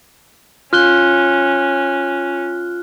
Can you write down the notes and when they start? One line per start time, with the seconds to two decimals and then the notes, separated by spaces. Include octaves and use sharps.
0.73 C#4 F4 F6 F#6 G7